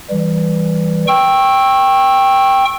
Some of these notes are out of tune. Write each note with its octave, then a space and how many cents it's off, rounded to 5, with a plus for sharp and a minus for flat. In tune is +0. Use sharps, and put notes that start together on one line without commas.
E3 +0 G3 +0
G5 +0 C#6 -25 E6 +0